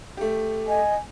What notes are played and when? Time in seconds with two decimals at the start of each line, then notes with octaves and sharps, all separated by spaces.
0.17 A3 G4
0.68 D#5 G#5